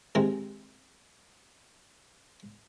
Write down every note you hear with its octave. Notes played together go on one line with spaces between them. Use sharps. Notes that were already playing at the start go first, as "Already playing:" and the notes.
C3 D#3 G#3